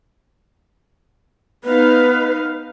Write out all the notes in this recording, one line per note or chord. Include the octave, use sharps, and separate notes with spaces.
B3 D#4 B4 F5